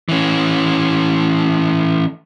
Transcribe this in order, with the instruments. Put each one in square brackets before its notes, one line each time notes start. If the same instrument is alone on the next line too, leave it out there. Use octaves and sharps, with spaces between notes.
[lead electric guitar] E3 C#4